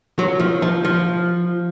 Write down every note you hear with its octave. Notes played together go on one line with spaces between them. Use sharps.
F#3
F3
F3
F3